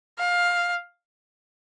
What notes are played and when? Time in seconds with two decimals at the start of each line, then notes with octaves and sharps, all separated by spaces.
0.19 F5